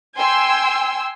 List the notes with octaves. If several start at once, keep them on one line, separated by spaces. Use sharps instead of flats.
G5 G#5 C6 E6